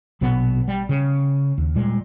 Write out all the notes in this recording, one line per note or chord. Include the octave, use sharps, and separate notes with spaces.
A#1 B2 F#3 B3
G3
C#3
D#2
A#2 G3 G#3